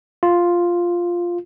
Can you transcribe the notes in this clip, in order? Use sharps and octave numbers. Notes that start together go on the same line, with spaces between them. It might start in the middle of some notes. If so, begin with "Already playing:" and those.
F4